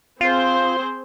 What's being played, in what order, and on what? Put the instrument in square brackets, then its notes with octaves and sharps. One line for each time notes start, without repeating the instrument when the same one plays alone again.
[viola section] C4 G#4 C5 [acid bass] F4